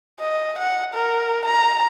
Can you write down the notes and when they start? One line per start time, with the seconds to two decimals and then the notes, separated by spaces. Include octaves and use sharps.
0.20 D#5
0.59 F#5
0.94 A#4
1.45 A#5